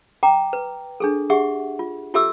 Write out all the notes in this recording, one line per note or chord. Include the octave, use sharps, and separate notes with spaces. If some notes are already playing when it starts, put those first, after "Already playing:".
G5 A#5 D6
B4
D4 G#4 A4
G4 G#4 E5 F#5 C#6
F4
F4 G4 A4 E5 D6 E6